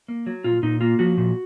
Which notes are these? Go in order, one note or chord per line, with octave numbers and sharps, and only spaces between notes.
A#3
F#3
A#2 F4
A#2 D#4
A#3 F4
F3 F#4
A#2